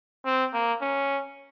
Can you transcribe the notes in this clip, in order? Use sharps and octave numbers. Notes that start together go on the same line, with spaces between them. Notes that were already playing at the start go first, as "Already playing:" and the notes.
C4
A#3
C#4